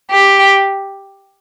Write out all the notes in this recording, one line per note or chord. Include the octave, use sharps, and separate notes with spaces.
G4